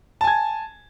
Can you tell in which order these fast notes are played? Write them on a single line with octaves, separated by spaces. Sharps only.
A5 G#5 G#6